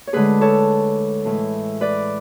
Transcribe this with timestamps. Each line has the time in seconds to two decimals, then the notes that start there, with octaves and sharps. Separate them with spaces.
0.07 C#5
0.13 D2 D3 G#3 G#4 B4
0.41 A4 C#5
1.25 A2 E3 G#3
1.81 B4 D5